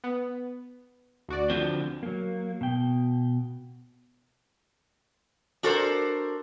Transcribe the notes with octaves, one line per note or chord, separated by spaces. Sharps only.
B3
D2 F#4 D5
D3 F3 C4
F#3 A#3
B2 G5
D4 F#4 A4 A#4 C5